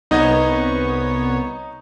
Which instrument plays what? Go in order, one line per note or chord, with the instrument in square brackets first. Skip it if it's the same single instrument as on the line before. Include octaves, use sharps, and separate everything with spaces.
[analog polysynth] C2 B3 C#5 [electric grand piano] D#4 D#5